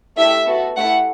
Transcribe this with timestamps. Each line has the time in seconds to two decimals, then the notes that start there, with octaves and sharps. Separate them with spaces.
0.17 A3 E4 G4 E5
0.46 B3 F#4 A4
0.77 A3 E4 G4 F#5